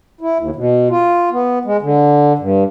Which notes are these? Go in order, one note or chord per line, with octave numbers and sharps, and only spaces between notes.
E4
D#2
B2
F4
B3
G#3
D3
G2